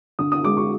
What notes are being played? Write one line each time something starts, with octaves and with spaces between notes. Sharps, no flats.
D3 D#6
D#6
G#3 D6
C#6